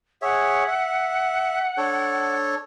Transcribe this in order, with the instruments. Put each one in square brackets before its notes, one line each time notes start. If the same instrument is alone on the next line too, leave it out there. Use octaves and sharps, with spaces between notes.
[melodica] G#4 C#5 E5 [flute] F#5
[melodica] E5
D4 A4 C#5